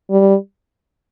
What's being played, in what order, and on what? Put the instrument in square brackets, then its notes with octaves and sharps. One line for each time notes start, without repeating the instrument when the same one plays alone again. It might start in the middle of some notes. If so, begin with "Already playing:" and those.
[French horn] G3